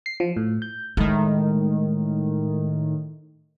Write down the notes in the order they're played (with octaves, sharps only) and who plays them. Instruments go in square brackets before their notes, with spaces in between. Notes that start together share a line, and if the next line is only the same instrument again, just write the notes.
[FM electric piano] C7
F3
A2
G6
[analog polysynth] A2 D#3 [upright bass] G#3